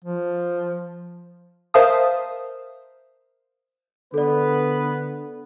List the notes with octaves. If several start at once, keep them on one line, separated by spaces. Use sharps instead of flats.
F3
A#4 C5 E5 F5 A5 D#6
D3 B3 A4 B4 D5